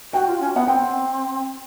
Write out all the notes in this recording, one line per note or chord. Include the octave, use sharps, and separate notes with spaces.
F#4 G5
F4
C#4
B3 F#5
C4 G5